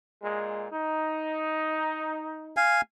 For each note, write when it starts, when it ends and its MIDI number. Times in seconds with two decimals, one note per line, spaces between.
0.22 0.66 46
0.22 0.66 56
0.72 2.70 63
2.57 2.81 77
2.57 2.81 80